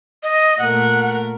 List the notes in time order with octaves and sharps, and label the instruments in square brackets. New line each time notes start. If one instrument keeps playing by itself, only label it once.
[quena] D#5
[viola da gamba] A#2 A3 A#4 [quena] F#5